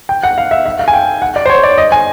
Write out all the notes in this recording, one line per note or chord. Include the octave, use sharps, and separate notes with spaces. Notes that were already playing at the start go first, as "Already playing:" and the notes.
G5
F#5
F5
E5
E5
F5
G#5
G5
F#5
D5
C5
C#5
D5
D#5
G#5